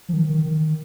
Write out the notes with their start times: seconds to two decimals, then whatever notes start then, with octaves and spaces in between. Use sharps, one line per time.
0.09 F3
0.13 D#3
0.29 D#3
0.46 D#3